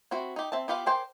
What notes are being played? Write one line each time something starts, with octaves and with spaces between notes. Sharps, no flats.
C4 E4 F#4
D#4 G4
C4 E5 A5
B3 F4 G4 B4 F5
G#4 A#4 C5 D5 G5